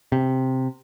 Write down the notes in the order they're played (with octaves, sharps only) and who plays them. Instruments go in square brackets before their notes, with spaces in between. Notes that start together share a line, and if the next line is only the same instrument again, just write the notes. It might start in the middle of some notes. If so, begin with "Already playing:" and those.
[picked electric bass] C3